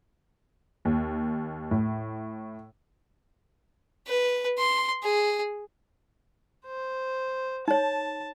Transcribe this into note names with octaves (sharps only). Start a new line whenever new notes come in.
D#2
A2
B4
C6
G#4
C5
D#4 C#5 A5